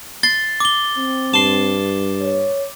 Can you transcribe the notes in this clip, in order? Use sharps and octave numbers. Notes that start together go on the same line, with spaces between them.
C6 A6
D6 G7
C4
G2 A5 C6
C#5